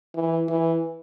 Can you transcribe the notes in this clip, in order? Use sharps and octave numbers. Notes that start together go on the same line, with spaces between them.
E3
E3